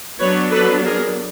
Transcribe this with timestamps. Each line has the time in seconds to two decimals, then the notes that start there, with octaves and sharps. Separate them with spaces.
0.20 F#3 B3 D4 B4 C#5
0.52 A4 B4
0.85 G#4 A#4